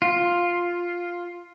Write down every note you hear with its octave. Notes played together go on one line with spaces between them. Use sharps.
F4